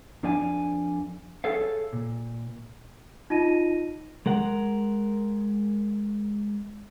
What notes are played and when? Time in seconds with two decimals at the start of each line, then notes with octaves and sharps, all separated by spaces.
0.23 F2 D4 A#4 D5 F5 G#5
1.44 G#4 A4 C#5 F5
1.93 A#2
3.30 D#4 F4 D#5 A5 A#6 D#7
4.26 G#3 A#4 F#5